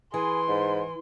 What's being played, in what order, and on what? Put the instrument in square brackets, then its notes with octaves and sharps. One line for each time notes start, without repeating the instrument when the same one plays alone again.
[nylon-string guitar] E3 [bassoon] G#4 [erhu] C6
[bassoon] G#2